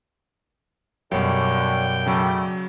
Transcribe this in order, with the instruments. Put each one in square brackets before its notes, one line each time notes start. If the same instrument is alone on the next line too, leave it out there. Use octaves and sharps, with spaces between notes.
[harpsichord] F#2 B2 [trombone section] D3 C#4 [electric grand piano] F#3 G3 [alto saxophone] G5
[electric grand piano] C#3 F#3 [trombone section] G3 A3